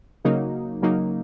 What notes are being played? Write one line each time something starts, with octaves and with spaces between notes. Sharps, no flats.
C#3 F#3 A#3 D#4
C#3 F#3 A#3 D#4